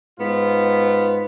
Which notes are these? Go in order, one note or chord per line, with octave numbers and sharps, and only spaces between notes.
G#2 B3 F4